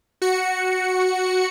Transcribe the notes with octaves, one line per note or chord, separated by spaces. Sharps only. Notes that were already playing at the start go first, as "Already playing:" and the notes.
F#4 C#7